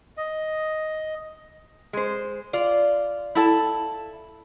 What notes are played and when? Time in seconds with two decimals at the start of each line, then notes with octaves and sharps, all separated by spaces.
0.17 D#5
1.93 G#3 C5
2.53 F4 D5
3.35 E4 A4 A5